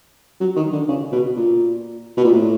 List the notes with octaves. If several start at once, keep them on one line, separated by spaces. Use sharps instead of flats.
F#3
D#3
D3
C#3
B2
A#2
B2
A#2
A2